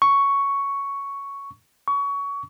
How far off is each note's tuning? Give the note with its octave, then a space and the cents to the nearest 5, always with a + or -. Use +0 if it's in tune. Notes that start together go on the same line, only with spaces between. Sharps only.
C#6 +5
C#6 +25